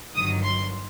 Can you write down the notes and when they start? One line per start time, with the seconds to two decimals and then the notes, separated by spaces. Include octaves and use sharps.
0.14 G1 G2 D#3 F#3 D#6
0.43 C6